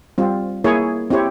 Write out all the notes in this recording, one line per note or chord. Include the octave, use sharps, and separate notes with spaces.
G3 C4 F4
A#3 E4 G#4 C#5
C4 E4 G4 C#5